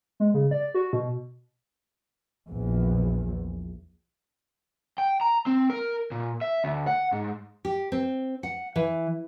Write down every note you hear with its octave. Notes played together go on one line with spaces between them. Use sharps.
G#3
C#3
D5
F#4
B2
A#1 E2
G5
A#5
C4
A#4
A#2
E5
D2
F#5
G#2
G4
C4
F#5
E3